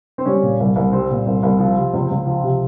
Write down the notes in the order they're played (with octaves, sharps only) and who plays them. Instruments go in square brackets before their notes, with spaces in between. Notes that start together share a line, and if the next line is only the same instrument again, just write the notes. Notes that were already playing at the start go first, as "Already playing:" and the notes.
[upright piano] C4
G3 C#4
A#2
C2
C2
G3 C4
A#2
C2
C2
F3
C3
C#2
C#2
F3
C3